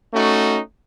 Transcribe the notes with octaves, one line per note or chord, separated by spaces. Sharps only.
A3 C#4 D#4 F#4